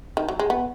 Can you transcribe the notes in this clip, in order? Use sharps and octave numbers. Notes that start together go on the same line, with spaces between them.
D#3
F#3
G#3
B3